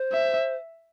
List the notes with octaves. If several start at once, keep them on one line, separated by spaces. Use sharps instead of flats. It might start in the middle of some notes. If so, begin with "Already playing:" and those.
Already playing: C5
E5